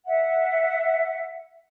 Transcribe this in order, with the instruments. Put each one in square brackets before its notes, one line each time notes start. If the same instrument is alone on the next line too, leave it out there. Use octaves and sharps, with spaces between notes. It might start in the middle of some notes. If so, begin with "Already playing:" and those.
[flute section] E5 F#5